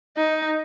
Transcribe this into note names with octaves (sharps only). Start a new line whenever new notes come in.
D#4